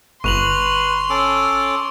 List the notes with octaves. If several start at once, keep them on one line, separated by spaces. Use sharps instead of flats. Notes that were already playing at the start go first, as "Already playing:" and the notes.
G1 B4 C6 C#6 F7 F#7
C#4 A4 D6